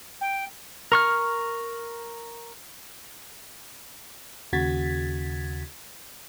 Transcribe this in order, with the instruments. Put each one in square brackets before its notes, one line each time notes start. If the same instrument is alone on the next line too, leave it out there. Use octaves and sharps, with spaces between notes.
[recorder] G5
[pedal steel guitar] A#4 C#6 F6
[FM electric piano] D#2 C#3 F#4 G#6 A6 B6